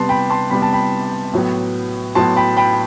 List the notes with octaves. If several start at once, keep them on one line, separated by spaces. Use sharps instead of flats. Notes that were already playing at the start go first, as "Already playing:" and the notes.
Already playing: C3 G3 B3 A5 C6
G5 B5
A5 C6
C3 G3 B3 B5
A5
G5 B5
A2 F#3 B3
A2 F#3 B3 A5 C6
G5 B5
G5 B5